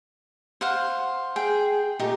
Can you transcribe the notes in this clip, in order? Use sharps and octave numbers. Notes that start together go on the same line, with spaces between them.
C5 F5 F#5
G#4 G5
A#2 A3 D#4 G4